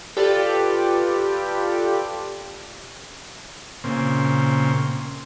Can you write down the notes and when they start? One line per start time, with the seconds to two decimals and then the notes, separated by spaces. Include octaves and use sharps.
0.17 F4 G4 A4 B4 D5
3.84 A#2 C#3 C4